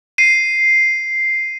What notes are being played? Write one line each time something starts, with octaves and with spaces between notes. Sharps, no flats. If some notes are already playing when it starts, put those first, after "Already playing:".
C7 D#7